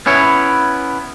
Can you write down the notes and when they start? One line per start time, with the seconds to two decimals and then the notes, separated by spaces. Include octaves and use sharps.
0.06 B3 C#4 E4 C#5